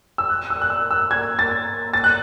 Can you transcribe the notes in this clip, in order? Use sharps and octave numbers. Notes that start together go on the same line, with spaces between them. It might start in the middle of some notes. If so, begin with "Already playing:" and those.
E6
F#6
E6
F#6
E6
E6
G#6
A6
A6
F#6